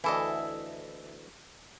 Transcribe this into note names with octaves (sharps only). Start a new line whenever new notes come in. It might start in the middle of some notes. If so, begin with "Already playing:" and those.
D2 E3 E4 A4 D#5